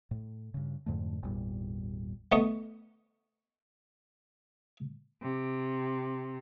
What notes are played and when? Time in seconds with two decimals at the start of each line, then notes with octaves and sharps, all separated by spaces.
0.11 A2
0.54 G2 C#3
0.86 F2 G#2 D3 A3
1.23 G#1 E2 A#2 G3
2.32 A3 B3 D#5 C#6
5.22 C3